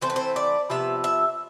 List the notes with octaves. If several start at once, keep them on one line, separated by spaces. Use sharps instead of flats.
E3 A3 C4 C5
B4
C5
D5
C3 F3 B3 E5
E5